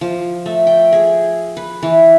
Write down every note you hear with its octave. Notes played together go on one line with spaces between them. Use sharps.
F3
A3
G5
G#4
B4
E3